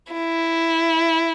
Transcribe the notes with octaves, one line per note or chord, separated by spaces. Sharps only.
E4